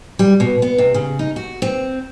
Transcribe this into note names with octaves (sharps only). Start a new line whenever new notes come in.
G3
B2
B3
C3
C#3
D#4
F#4
C4